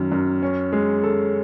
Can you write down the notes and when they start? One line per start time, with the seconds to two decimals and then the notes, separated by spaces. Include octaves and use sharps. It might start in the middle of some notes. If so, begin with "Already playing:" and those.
Already playing: F#2 D#3
0.12 F#2
0.43 C#4
0.72 G#3
1.03 A4